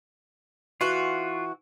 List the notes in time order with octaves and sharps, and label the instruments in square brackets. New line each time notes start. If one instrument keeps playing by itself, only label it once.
[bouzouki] E3 F#4 [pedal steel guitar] F4